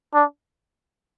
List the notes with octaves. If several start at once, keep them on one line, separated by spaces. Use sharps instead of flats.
D4